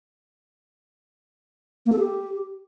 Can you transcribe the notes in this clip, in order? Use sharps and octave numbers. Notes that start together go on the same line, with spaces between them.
A#3
A4
G4